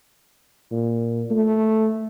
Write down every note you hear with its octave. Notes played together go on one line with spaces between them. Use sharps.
A#2
A3